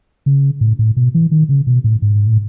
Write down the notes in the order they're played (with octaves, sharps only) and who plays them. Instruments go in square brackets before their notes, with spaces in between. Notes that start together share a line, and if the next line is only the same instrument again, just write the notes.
[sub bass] C#3
A2
A2
B2
E3
D#3
C#3
B2
A2
G#2
A2